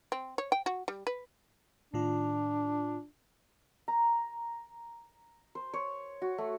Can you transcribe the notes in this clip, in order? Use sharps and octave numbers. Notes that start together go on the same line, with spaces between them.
C4
C#5
G5
F#4
G3
B4
A2 D#3 D4 F4
A#5
C5
C#5
F#4
A3